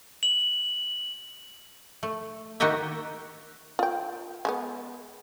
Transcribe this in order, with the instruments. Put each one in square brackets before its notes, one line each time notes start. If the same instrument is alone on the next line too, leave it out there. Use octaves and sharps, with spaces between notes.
[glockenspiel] F#7
[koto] A3
D#3 D#4 F#4 G4 D#5 E5
[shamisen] F4 G5
G#3 A3 B3